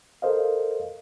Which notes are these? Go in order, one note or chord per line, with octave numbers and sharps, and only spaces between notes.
A4 A#4 C5 D#5 F5